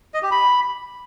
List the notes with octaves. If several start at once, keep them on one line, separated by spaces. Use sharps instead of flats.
D#5
G4
B5